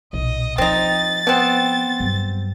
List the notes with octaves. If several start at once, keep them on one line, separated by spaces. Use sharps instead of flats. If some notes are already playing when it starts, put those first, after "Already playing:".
B1 A#2 D#5
F3 C4 D#4 A6
B2 B3 C4 F#5
G2 F#3